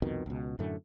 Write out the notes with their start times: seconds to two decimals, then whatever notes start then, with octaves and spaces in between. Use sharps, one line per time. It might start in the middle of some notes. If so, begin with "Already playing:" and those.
0.02 C2 F2 B2 D#3
0.26 C#2 B2
0.59 F#2 A2 D3 A3